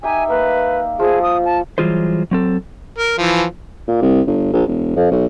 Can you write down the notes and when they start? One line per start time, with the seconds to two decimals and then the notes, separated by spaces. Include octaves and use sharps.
0.03 D#4 G4 E5 G#5
0.30 A#3 B4
1.00 F3 G#4 E6
1.22 D#6
1.45 A5
1.78 E3 F#3 G3 F4 G#4 C5
2.31 F#3 C4 A4
2.98 A#4
3.18 E3 F3
3.88 A#2
4.02 C2
4.27 G1
4.53 A#1
4.67 E1
4.96 F2
5.11 B1